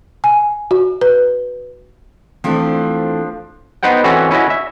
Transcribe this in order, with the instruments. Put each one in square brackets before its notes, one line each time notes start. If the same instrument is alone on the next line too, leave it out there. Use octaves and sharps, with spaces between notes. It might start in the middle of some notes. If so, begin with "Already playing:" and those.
[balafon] G#5
F#4
B4
[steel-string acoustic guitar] E3 A3 C4 [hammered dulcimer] F3 D4
[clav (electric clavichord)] B3 D#4 B4 C5 F#5 G5
E3 C4 C#4 F#4 A4
C#4 E4 F#4 D#5
E5